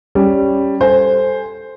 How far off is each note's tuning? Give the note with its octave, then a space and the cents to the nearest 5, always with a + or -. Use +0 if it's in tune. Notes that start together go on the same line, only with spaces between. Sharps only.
G3 +0 C#4 +0
A4 +0 C5 +0 G#5 +0